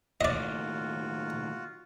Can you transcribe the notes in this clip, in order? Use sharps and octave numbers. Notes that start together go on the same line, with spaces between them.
D#2 A2 F4 F#4 D5 D#5